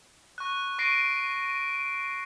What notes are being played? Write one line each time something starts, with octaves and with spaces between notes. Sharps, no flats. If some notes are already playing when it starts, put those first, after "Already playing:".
C#6 F#6
C#6 A#6 C7 D7 D#7